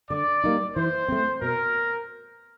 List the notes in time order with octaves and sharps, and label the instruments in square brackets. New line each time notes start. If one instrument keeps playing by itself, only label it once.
[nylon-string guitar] D3 [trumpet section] D5
[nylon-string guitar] G3 A#3 D#4
[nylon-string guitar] E3 [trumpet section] C5
[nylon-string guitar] A3 C4
[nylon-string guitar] B2 [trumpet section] A#4